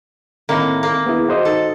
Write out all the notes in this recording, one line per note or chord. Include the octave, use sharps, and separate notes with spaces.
A2 D#3 A#3 C4
A#3
B3 E4 G#4
F#4 C5 D#5
D#4 A4